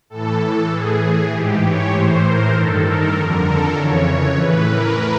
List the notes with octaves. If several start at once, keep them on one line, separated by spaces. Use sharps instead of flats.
A2 E3 A4
A2 E3 G#4
G#2 E3 G4
C#5
A2 E3 C5
A#4
G2 D#3 A4
A#4
F2 D3
A4
F2 C#3 E3 C#5
A2 E3 B4
A#4